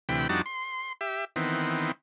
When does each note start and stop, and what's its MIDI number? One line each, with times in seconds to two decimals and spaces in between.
0.09 0.27 38
0.09 0.27 48
0.09 0.27 52
0.09 0.27 79
0.09 0.27 83
0.29 0.42 41
0.29 0.42 55
0.29 0.42 62
0.29 0.42 63
0.29 0.42 66
0.29 0.42 81
0.46 0.93 84
1.01 1.25 67
1.01 1.25 76
1.36 1.92 51
1.36 1.92 52
1.36 1.92 59
1.36 1.92 60